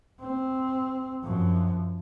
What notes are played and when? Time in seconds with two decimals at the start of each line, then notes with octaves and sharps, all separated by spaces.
0.21 C4
1.23 F#2 F3